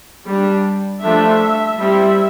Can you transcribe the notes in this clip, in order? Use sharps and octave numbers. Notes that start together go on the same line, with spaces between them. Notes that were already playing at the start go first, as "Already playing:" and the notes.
G3 D4
F3 A3 D4 E5
G3 C4 E4 E5